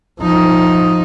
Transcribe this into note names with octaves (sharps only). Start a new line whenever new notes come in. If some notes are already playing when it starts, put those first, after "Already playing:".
F3 D#4